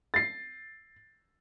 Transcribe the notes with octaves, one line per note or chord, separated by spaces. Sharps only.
A6 C7